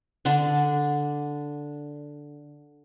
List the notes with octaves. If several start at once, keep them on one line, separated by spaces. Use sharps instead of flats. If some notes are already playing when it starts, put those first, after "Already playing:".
D3 D4